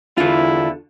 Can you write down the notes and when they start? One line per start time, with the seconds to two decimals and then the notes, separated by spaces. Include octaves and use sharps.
0.18 E2 D3 E4 F4